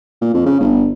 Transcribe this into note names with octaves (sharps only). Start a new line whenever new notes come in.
A#2
F2
C#3
G1